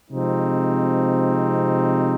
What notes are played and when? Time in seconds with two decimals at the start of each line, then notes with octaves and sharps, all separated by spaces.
0.11 C3 F3 G#3 C4 D#4